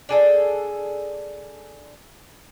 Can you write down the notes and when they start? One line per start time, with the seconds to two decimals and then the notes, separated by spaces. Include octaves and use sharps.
0.09 D4 G#4 A4